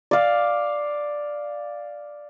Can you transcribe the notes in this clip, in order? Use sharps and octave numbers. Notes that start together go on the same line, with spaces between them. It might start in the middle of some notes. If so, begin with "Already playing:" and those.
D5 F5